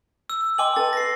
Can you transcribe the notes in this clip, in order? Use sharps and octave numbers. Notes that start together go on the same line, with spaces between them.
E6
D#5 G5 G#5 C6 D6 F#7
A4 B4 A6
A#6 C7